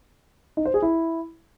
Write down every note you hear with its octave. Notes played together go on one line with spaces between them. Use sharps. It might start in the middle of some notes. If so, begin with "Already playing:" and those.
D#4
C5
G#4
E4